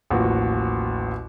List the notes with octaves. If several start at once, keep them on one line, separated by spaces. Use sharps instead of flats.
A1 D#2 F3 F#4